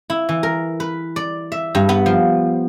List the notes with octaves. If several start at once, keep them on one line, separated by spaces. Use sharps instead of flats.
E4
E3
A#4
B4
D5
E5
G2
B3
F3